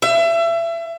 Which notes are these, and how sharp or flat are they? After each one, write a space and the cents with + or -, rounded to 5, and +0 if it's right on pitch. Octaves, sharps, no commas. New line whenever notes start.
E5 +30